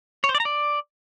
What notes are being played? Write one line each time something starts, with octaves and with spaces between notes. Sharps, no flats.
C#5
C5
D5
A#5
D5